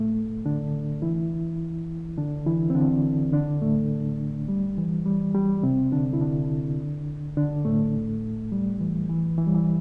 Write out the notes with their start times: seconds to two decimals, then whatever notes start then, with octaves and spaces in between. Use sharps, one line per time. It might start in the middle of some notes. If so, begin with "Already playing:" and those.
Already playing: A2 A3
0.45 D3 D4
1.02 E3 E4
2.18 D3 D4
2.46 E3 E4
2.70 C4
2.75 D3 D4
3.33 D3 D4
3.62 A2 A3
4.48 G3
4.77 E3
5.06 G3
5.35 G3
5.63 C3 C4
5.92 D3 D4
6.13 E4
6.21 D3 D4
7.37 D3 D4
7.65 A2 A3
8.52 G3
8.80 E3
9.09 E3
9.38 E3
9.47 G3
9.55 E3